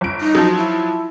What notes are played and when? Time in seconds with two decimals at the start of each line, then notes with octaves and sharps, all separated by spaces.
0.01 G1 D7
0.21 D#4
0.35 F3 F#3
0.58 E4